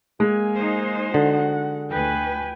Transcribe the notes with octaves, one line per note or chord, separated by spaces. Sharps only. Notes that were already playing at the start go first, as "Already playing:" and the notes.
G#3 A#3 G#5
D#4 C5
D3 F#4 F#5
D2 B4 G5 G#5